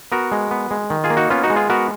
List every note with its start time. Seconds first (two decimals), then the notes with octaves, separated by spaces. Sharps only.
0.12 B3 F#4 A#4
0.32 G#3
0.51 B3
0.71 G#3
0.90 D#3
1.04 F4 G#4
1.10 A#3
1.17 D#4 F#4
1.30 B3 C#4 F4
1.43 D#4 F#4
1.50 G#3
1.56 F4 G#4
1.70 B3 F#4 A#4